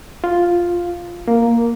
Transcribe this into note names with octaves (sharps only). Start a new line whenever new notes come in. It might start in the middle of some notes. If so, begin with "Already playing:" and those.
F4
A#3